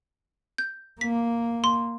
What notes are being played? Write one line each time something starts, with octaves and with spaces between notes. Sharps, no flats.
G6
A#3 B6
C6